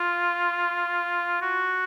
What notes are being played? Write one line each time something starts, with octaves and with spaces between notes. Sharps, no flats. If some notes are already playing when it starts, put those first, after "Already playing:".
Already playing: F4
F#4